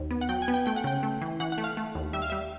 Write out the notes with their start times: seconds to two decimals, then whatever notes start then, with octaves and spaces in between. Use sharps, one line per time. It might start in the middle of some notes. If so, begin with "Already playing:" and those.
Already playing: D#2
0.11 B3
0.21 F#5
0.29 F#3 G5
0.42 G#5
0.48 B3
0.54 G5
0.66 A3 G5
0.76 F#5
0.84 C#3 G5
1.03 A3
1.22 E3
1.40 E3 F#5
1.52 F#5
1.58 A3
1.64 F5
1.77 A3
1.95 D#2
2.13 G3 E5
2.22 F5
2.30 G3 E5